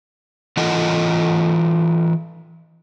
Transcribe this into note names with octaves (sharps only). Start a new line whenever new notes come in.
E3 F4 A4 D#5 F#5